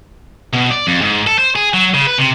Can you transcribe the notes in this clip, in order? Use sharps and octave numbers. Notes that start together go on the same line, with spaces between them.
B2
D5
F2
G#2
A4
C5
G#4
F#3
C#3
B4
C3